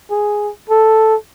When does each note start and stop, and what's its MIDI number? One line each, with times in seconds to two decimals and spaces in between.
0.10 0.51 68
0.69 1.15 69